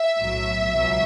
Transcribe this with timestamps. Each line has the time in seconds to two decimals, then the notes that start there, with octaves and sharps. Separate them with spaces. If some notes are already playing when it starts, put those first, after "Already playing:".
Already playing: E5
0.18 B1 A2 F#3
0.72 C#2 B2 F#3